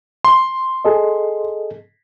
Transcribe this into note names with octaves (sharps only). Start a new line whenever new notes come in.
C6
G#4 A4 D#5